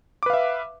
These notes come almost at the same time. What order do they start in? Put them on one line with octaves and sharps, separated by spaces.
D6 B4 F5 E5